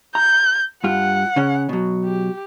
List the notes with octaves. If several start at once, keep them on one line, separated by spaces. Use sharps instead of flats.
A#5 G6
G2 F4 F#5
C#3 C#4
B2 F#3
G4